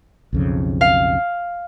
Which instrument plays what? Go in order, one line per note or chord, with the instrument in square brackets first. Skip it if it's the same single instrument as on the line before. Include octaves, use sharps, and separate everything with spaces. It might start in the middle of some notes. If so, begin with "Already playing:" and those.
[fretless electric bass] B1 F2 C#3
[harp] F5